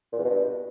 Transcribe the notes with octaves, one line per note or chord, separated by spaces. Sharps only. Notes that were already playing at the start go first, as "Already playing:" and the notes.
A#2
E2
B2
G2